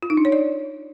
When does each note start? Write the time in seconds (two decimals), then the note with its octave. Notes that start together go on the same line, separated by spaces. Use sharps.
0.03 F4
0.10 D#4
0.17 D4
0.25 C#5
0.32 D5